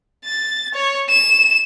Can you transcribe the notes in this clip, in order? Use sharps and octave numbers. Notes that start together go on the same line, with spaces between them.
A6
C#5
E7